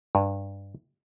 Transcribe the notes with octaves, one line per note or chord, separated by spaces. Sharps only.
G2